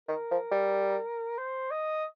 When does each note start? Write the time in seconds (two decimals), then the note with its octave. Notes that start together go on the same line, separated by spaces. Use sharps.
0.08 D#3 A#4
0.31 F3
0.51 G3
1.38 C5
1.71 D#5